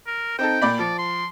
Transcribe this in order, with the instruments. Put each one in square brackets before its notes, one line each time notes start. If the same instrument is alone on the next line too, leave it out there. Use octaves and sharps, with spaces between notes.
[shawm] A#4
[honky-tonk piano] C4 D#4 A4 [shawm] G5
[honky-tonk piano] A#2 D5 B5
[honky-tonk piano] F3 [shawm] D5
[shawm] C6